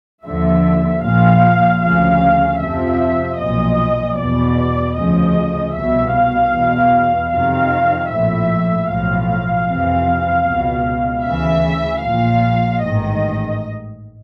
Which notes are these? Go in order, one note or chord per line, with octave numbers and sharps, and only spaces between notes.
D#2 D3 F3 E5
A#1 A#2 F3 F5
D2 C#3 F3 F5
F2 C3 F3 E5
B1 A#2 F3 D#5
E2 B2 D5
D2 C#3 F3 D#5
C2 B2 E5
F5
E2 B2
F2 C3 D#3 F5
A#1 A2 F3 E5
B1 A2 F3 F5
F5
F2 C3 E3
C#2 B2
D2 C#3 E3 E5
A#1 A#2 F3 F5
A1 G#2 D#3 D#5